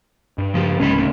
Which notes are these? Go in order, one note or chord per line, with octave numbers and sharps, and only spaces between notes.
G2
C#3 F3 G4
D1 C#2 G#3 C#4 B5
C#3 A3